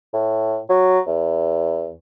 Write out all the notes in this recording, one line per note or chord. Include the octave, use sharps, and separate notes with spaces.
A2
F#3
E2